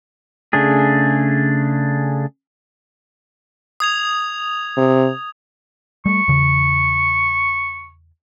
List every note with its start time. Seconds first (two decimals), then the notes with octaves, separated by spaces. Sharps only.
0.53 C#3 A3 D4 G#4
3.80 D#6 G#6 F7
4.77 C3
6.06 G3 A3 C#6
6.28 E2 C#3